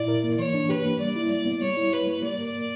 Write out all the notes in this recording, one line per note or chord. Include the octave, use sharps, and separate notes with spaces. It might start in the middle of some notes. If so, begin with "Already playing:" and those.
Already playing: A#2 E4 D5
A#4
A#3
E3 C#5
D4
G4 B4
A#3
G3 D5
E4
G3 D5
B3
G3 C#5
E4
G4 B4
A#3
A#3 D5
A#4
A#3